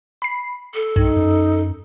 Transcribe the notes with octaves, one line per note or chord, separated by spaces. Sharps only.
B5 C7
A4
B1 G2 D#4
F#2